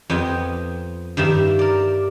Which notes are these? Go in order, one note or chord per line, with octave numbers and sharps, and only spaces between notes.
F2 B3 D#5 G5 G#5
G2 D#3 A#3 E5
A#4 D5